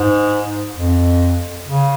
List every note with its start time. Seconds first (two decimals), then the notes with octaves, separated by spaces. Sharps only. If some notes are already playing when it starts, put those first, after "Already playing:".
Already playing: G#2
0.76 F2
1.67 C#3